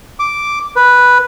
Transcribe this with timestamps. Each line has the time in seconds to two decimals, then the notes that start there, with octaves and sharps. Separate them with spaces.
0.19 D6
0.76 B4